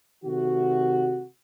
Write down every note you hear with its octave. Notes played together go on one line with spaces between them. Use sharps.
C3 D#3 A3 F#4